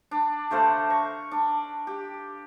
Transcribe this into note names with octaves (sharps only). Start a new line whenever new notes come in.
D4
D3 A3 C5 F5
A#5 C#6
D4
G4